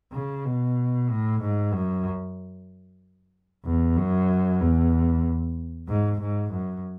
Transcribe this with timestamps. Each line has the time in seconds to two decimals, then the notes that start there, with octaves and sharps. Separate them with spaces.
0.12 C#3
0.45 B2
1.09 A2
1.41 G#2
1.73 F#2
3.65 E2
3.97 F#2
4.60 E2
5.89 G#2
6.20 G#2
6.52 F#2